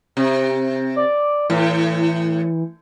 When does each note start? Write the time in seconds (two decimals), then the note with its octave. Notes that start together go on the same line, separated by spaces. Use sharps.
0.17 C3
0.96 D5
1.50 A2 E3